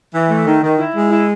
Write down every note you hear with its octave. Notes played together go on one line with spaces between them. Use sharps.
E3
A3
D#3
D#3
E4
G#3
E4